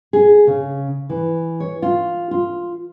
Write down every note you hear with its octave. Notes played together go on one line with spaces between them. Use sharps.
G#4
C#3
E3
C#5
F4
F4